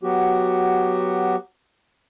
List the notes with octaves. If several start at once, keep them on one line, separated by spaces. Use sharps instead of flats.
F#3 B3 F#4 G4